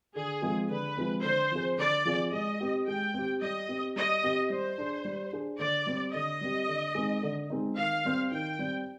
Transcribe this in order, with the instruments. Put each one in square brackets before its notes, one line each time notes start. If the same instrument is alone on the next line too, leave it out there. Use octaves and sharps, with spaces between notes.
[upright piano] D3 [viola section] G#4
[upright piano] F3 G#3 C4
[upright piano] D3 [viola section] B4
[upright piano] F3 G#3 C4
[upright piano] D3 [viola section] C5
[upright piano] F3 C4 F4 G#4
[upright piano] D3 [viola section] D5
[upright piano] F3 C4 F4 G#4
[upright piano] G#3 [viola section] D#5
[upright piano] C4 G4
[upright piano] G#3 [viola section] G5
[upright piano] C4 G4
[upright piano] G3 [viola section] D#5
[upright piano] C4 G4
[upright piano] G3 [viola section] D#5
[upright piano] C4 G4
[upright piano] G3 [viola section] C5
[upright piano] D4 G#4
G3
D4 G#4
[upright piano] D3 [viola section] D5
[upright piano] G3 C4 G4
[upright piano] D3 [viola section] D#5
[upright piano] G3 C4 G4
D3
G#3 C4 D#4
D3
G#3 C4 D#4
[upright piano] D#3 [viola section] F5
[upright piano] G3 C4
[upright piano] D#3 [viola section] G5
[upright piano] G3 C4